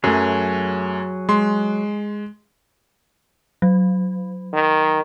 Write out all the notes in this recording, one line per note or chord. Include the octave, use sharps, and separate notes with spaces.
F#2 F#3 A3 G#4
G#3 C6
F#3
D#3